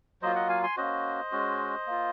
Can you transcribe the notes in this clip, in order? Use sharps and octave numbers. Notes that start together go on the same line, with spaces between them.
F#3 A#3 F4 C5 D#5
D#5 F#5
F5 G#5
G#5 C6
A#3 C#4 F#4 C5 D#5
G#3 C#4 F#4
A#3 F4